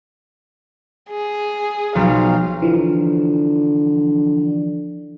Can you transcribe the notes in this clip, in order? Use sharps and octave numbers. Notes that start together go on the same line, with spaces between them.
G#4
B1 F3 F5
D3 E3 F3